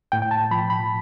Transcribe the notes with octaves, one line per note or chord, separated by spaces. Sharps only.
A2 G5
G5
A5
F3 B5
B5